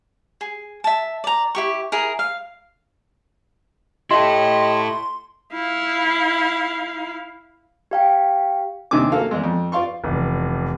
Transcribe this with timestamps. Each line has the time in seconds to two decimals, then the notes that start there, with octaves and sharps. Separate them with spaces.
0.41 G#4
0.84 E5 A5
1.24 D5 A#5
1.55 E4 G4 C#6
1.92 E4 G#4 A#4
2.19 F5
4.11 E4 G4 A4 D#5 C6
5.53 E4 F5
7.91 G4 F5 G5
8.91 D#2 C3 D#3 D4 G#5 D6
9.12 F#3 A#3 A4 F5
9.31 E2 G#3
9.44 F2
9.72 F4 D5 F5 C6 C#6
10.04 F1 E2